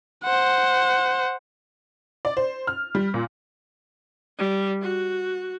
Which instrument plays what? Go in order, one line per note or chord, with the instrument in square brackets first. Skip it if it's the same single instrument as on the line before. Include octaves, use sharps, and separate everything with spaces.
[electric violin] C5 F#5
[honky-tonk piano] D5
C5
F6
G3
A#2
[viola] G3
F#4